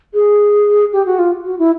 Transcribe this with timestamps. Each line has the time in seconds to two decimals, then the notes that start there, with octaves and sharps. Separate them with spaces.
0.14 G#4
0.93 G4
1.06 F#4
1.19 F4
1.45 F#4
1.59 E4